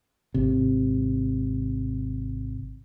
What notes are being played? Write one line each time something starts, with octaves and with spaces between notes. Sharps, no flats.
G#1 C3